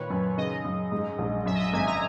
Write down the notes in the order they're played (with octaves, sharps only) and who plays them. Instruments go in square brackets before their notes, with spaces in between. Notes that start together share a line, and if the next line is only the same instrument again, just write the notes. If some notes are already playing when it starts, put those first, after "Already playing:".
Already playing: [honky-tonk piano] A#2 D#3 [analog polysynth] B4 C#5
[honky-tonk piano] F#2
[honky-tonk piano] C#3 [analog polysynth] D#5
[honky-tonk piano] F#2
G#2
A#1
[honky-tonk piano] F#2 [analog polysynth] E5
[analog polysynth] D#5
E5
[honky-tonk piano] G#1 [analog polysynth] G#5
[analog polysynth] A#5